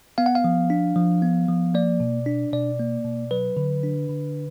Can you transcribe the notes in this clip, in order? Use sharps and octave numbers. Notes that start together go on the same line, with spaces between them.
B3 F5
F#5
F5
F3
D4
F3
B3
F3
A#3 D5
B2
D4
B2 D5
A#3
B2
F#3 B4
D3
D4
D3